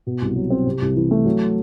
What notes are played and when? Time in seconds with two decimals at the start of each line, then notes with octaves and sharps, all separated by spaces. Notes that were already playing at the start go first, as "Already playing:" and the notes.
0.07 B2
0.22 C2
0.36 F#3
0.50 C4
0.67 C3
0.82 C2
0.96 E3
1.11 A3
1.25 F#3